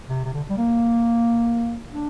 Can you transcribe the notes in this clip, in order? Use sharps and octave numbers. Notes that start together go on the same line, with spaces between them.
C3
C3
D3
G3
A#3
D4